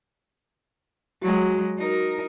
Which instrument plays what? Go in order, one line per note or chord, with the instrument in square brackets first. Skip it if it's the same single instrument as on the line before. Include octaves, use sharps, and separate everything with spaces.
[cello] F#3 G#3 [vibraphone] F#4
[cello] D#4 A#4